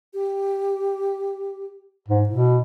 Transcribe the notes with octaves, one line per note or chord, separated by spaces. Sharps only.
G4
G#2
B2 E4